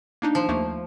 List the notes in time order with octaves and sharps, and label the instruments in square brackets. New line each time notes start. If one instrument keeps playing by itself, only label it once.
[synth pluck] A#3 D4 D#4
[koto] F3
[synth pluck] D#2 A3 A#3